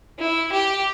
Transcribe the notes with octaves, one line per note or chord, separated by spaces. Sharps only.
E4
G4